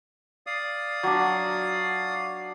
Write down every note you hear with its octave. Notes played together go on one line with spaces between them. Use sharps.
D5 F5 D#6
F#3 D4